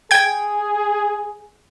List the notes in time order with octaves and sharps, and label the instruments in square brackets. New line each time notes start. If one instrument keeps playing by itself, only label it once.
[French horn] G#4 [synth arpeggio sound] G5 G#6